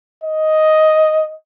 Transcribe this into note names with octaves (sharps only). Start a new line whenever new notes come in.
D#5